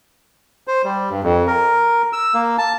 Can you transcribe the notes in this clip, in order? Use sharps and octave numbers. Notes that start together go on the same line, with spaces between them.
C5
G3
G2
F2
A#4
E6
A#3
A5